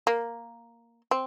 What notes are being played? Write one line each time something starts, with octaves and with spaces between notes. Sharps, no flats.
A#3
C4